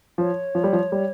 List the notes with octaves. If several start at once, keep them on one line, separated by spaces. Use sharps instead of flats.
F3 C#5
F3
G3
F3
G3